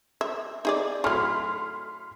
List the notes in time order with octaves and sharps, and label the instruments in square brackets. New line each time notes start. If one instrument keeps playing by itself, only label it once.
[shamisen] E5
D#4 G#4 D5
[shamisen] F#3 A3 [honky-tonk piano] B5 C6 F6